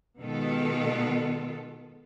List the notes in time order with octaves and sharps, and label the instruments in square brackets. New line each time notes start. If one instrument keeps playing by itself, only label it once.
[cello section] B2 D#3 G#3 B3 F4 A4